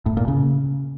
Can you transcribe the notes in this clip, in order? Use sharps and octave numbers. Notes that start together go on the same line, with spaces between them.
A2
A#2
C#3